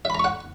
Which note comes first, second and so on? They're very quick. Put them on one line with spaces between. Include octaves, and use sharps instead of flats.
E5 B5 A#5 C#6 F#5